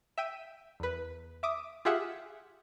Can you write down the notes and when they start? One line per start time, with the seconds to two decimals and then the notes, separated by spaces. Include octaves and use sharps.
0.18 E5 G5 D#7
0.80 E2 B4
1.43 E5 D6 D#6
1.85 F4 G4 G#4 E5 F#5